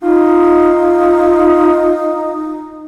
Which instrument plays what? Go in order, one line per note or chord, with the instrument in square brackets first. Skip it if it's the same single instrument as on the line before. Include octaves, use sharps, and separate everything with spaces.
[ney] D#4 [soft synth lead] F4